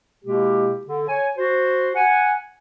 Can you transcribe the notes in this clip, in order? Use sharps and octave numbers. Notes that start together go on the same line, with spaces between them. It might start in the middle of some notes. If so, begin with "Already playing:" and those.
B2 G#3 A#3 E4 G4
D3
C#5 G#5
F#4 C5
F#5 G#5